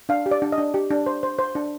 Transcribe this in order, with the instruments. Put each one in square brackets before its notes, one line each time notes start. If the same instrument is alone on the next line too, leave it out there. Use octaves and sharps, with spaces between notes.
[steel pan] D4 F5
G4
D5
D4
D#5
D4
G4
D4
C5
C5
C5
D4